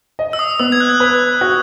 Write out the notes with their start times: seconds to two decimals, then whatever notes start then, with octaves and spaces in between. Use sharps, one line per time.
0.19 D#5
0.33 E6
0.39 D#6
0.59 B3 E6
0.72 G#6
0.80 F#6
1.00 B4
1.41 F#4